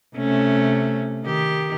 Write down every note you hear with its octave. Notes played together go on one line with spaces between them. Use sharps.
C3 A3 C#4
D#3 G4